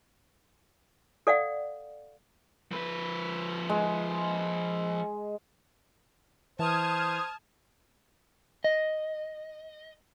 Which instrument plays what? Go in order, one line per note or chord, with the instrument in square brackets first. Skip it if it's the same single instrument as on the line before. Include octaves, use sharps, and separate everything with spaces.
[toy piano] A4 D5 F5 F#5
[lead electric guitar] F3 B4
[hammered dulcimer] G#3
[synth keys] E3 [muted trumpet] C5 [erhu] A5 [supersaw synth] D#6 F6 G#6
[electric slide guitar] D#5